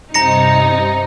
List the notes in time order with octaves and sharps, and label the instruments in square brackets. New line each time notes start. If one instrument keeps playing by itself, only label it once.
[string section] G2 C3 D#4 [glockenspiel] A#5 A#6 C#7